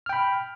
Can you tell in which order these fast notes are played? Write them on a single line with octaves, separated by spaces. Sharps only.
F6 G5 B5